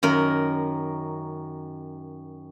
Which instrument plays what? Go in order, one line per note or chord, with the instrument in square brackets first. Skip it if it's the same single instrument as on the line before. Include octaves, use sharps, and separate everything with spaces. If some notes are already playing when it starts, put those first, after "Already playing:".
[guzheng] F#2 D#3 A#4